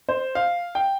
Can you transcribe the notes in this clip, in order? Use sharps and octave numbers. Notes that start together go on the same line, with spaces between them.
C5
F5
G5